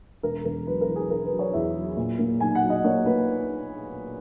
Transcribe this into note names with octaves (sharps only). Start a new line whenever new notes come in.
E1 A#4
E1 A#4
F#3 B4
A#4
E2
G#4
E1 A#4
B4
F#3
C#5
E2 E5
F#3
A#2
A#3
B1 G#5
F#5
F#3
D#5
A#3 C#5
A#3 B4